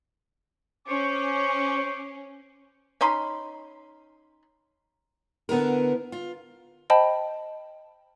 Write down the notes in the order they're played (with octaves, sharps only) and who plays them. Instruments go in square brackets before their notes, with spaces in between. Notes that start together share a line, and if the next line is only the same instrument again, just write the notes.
[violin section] C#4 [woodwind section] C5 C#6 D6
[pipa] C#4 D#4 B5 C6
[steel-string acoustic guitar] D3 B3 E4 A#4
F4
[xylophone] C5 D#5 G5 A5 B5